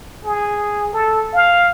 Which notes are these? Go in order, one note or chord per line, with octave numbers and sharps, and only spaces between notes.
G#4
A4
F5